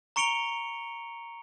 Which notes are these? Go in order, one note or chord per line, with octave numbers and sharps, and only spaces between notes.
A#5 C#6 C#7 D7 F7 G7